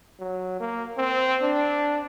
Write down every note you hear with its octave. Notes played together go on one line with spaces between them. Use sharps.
F#3
A#3
C4
D4